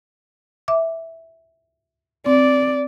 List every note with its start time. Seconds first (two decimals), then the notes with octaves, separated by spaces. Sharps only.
0.68 E5 D6
2.26 C4 D5